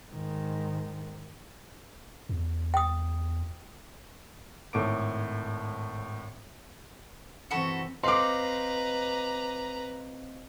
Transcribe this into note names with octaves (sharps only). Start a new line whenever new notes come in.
G#2 D#3
E2
G5 D#6
G#1 A2 A4 C#5 D6 D7
E3 C4 F#4 A4 B5
C4 B4 C5 D#5 F5 A#5 C6 D6